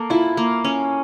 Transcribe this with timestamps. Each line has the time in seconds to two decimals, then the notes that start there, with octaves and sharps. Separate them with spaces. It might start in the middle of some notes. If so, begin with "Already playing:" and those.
Already playing: A#3 A4
0.10 E4 F4
0.37 A#3
0.64 C#4